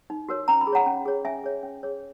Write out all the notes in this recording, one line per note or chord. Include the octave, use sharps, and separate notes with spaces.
D#4
F#4 A#4 C#5
C#4 A#5
B5
G#4
C#5 F#5 A#5
C#4
G#4 C#5
C#4 E5 G#5
G#4 C#5
C#4
G#4 C#5